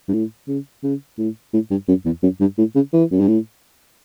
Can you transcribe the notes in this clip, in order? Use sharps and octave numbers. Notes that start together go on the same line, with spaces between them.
G2
A2
C#3
C#3
A2
A2
G2
F#2
E2
F#2
G2
A2
C#3
E3
F#2
G2
A2